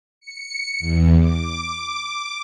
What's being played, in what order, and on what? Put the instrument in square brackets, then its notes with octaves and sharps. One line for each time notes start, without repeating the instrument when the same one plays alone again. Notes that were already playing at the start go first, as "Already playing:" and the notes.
[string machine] C#7
E2
D6